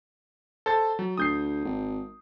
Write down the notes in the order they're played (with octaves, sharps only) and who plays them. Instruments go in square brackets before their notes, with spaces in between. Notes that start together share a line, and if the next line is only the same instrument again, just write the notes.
[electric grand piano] A4 C5 A6
F#3
[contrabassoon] D2 [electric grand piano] D#6 G6 C7
[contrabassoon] G#1